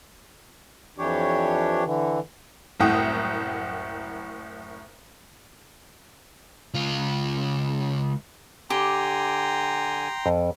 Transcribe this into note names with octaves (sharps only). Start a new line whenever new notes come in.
F2 E3 D4 G4 C#5
D3 E3
F#1 C2 A2 F#5 G5 D#6
C#2 F4
D3 G4 G5 G#5 A#5 C6
F2